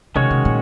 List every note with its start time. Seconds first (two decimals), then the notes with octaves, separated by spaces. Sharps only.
0.15 C3 D#3 G#3 C#4 F#4 C#5
0.30 C3
0.45 A#2